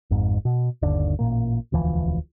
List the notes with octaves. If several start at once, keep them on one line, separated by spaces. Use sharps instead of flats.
G#1 F2 G#2
B2
G1 D#2 D3 D4
A1 A#2 A#3
E1 D2 E3 F3